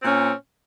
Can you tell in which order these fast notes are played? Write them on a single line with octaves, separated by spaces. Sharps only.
C4 A#2 C#4